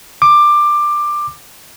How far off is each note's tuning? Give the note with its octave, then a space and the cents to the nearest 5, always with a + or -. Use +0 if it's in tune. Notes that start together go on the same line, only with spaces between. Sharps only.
D6 +15